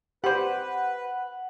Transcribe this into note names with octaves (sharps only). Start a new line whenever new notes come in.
G4 B4 C5 F#5